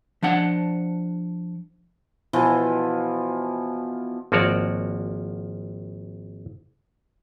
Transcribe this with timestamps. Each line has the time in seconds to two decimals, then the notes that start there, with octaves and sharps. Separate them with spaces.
0.22 F3 D4 F#5
2.33 B2 E3 F3
4.32 G#1 F3 A#3 F#4 C#5 D5